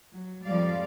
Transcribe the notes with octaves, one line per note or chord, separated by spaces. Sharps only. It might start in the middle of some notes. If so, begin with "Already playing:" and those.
F#3
F2 F3 G3 G#3 D5 F5